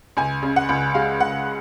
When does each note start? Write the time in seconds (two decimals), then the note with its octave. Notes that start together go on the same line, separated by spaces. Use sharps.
0.17 C#2 G#5
0.43 C#3
0.56 F#5
0.69 C#2
0.95 G#3 F5
1.20 C#2 F#5